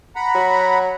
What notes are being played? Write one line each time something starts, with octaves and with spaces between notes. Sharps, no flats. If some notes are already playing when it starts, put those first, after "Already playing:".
F#5 A#5 B5
F#3